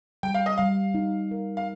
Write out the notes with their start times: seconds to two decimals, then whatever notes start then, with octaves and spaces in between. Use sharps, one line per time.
0.23 G3 G5
0.34 F5
0.46 D#5
0.58 G3 F5
0.95 D#4
1.31 A#4
1.57 F5